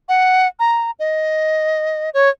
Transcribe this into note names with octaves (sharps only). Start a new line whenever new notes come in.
F#5
A#5
D#5
C#5